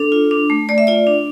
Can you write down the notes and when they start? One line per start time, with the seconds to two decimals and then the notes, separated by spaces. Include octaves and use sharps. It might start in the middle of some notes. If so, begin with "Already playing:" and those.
Already playing: D4 A4
0.12 F4
0.31 D4
0.50 A3
0.69 A3 D5
0.78 E5
0.87 F4 D5
1.07 D4